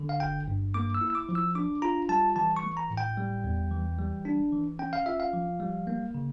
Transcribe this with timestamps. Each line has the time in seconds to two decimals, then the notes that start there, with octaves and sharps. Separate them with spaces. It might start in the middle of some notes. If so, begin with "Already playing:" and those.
Already playing: D3
0.09 F5
0.20 G1 G5
0.48 G2
0.74 A#3 D6
0.94 E6
1.01 E4
1.10 E6
1.15 D6
1.29 F3
1.35 E6
1.55 D4 D6
1.82 F4 A#5
2.09 G3 A5
2.36 E3 A5
2.57 C#6
2.63 A3
2.77 A#5
2.90 A2
2.97 G5
3.17 G3
3.44 E2
3.71 E3
3.98 G3
4.25 D4
4.52 E3
4.79 C#4 G5
4.93 F5
5.06 F4 E5
5.20 F5
5.33 F3
5.60 G3
5.87 A#3
6.14 C#3